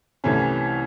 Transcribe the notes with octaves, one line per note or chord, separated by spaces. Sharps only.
C2 C3 E3 A3 C#4